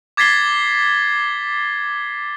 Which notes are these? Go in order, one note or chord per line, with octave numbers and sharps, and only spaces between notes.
D6 G#6 A6 B6 C7 G7